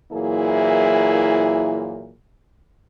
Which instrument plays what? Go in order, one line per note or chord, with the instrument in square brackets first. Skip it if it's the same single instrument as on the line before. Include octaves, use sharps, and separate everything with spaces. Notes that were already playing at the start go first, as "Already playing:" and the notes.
[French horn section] A#2 E3 F#3 A#3 E4 G#4